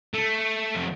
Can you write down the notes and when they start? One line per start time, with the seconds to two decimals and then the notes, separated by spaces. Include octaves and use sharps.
0.14 A3
0.76 F3